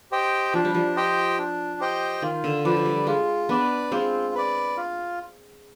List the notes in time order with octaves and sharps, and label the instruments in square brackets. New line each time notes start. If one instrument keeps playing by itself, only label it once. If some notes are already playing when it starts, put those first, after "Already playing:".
[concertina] G4 C5 D#5 G5
[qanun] F3 [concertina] D4
[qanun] G3
F3
[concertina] G4 C5 D#5 G5
D4
G4 C5 D#5 G5
[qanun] D#3 [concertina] F4
[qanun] D3
[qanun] F3 [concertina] B4 D5
[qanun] F3
G3
[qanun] G#3 [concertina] F4
[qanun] B3 D4 [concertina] B4 D5
[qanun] G#3 C4 [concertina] F4
[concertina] B4 D5
F4